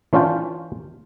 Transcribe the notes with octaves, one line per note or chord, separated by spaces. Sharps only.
E3 C#4 D4 F4 G5